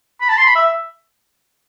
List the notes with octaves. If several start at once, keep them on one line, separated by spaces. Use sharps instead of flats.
B5
A5
C6
B5
E5